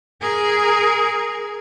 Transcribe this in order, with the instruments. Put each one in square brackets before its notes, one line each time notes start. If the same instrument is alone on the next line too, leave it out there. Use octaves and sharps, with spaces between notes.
[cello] G#4 A#4